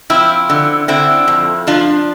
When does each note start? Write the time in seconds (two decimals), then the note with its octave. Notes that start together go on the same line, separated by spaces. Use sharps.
0.10 F3 C4 E4
0.50 D3
0.88 D3 C4 E4
1.28 F2
1.67 F3 D4 F4